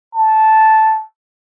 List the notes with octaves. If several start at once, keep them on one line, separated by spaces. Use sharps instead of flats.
A5